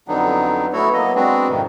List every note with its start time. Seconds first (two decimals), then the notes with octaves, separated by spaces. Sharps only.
0.08 F2 D3 F#3 B3 D4 D#4
0.73 A3 B3 E4 F#4 A4 C#5
0.93 F#3 A#3 B3 D#5
1.15 G#3 B3 C4 D4 F#4
1.49 F2 G#2 C3 D#3